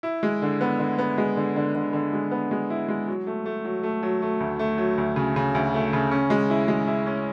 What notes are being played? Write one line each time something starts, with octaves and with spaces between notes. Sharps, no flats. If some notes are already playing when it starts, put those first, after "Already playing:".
E4
G#3
D3
B3
D3
B3
G#3
D3
D3
D3
D3
G#3
B3
G#3
E4
G#3
F#3
A3
A3
F#3
A3
F#3
A3
D2
A3
F#3
D2
C#3
C#3
D2
A3
C#3
C#4
G#3
E4
G#3
E4
C#4